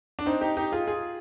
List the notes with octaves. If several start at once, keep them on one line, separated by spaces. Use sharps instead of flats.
D4
C4 D#4
D#4 G4
D#4 G4
F4 G#4
F4 G#4